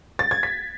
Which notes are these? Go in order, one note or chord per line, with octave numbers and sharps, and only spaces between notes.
A6
G#6
B6